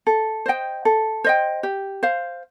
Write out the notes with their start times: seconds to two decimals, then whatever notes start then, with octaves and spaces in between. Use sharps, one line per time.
0.07 A4
0.46 C5 D#5 G5
0.85 A4
1.24 C5 D#5 G5
1.63 G4
2.03 C5 F5